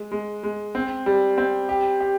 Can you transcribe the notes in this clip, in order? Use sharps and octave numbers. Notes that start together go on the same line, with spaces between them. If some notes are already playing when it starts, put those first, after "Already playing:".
Already playing: G#3
G#3
G#3
C4
G3
C4
G4
G4